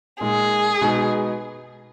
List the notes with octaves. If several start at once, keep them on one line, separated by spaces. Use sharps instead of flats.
A#2 G#3 D#4 G#4
B2 G#3 B3 D#4